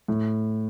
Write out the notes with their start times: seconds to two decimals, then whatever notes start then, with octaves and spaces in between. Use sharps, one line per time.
0.08 A2